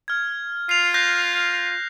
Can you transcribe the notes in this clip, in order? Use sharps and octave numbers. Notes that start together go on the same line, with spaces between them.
F6 G#6
F4 C7 F7
F#6 G6 A#6